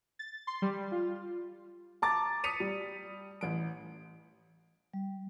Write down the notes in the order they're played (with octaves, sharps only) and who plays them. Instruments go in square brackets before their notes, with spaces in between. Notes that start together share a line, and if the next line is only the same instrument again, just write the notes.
[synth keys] A6
C6
G3
F4
[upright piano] A5 A#5 D6 A6
D#6 B6 C#7 D#7 F7
G3
A1 D7
[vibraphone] G3